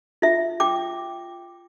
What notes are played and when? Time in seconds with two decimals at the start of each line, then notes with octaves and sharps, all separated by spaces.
0.22 F4 E5
0.60 G5 D6